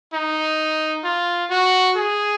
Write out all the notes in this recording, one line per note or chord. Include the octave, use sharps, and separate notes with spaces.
D#4
F4
F#4
G#4